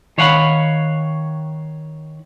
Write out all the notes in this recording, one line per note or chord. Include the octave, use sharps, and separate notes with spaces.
D#3 C#5 F5 F#5 A#5 B5